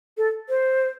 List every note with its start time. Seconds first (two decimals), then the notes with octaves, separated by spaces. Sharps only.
0.18 A4
0.49 C5